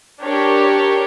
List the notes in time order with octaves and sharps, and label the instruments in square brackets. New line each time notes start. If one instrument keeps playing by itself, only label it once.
[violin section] D4 G4 A#4 C#5